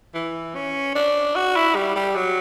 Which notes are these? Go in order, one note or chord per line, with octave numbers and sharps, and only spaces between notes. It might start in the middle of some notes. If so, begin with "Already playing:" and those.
E3
C#4
D4
F#4
E4
G3
G3
F#3